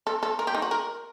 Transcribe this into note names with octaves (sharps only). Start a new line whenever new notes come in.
A4
A4
A#4
G4
D#4
F#4
A#4